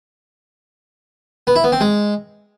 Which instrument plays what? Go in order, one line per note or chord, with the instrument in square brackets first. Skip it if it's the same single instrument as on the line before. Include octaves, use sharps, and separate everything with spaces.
[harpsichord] B3
E4
B3
C4
G#3